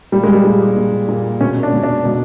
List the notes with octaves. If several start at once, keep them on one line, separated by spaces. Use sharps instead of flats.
A#2 G3
G#3
G3
A#2
A#2
A#2
B2 C#4
D4
B2
D4
B2